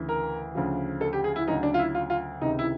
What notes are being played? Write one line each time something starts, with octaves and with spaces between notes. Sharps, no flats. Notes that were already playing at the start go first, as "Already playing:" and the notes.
Already playing: D2 C#3 E3
A#4
D2 C#3 F3
A4
G4
G#4
E4
D2 C#3 F#3 D#4
D4
F4
E4
F4
F4
C#2 C3 D#3 D#4
E4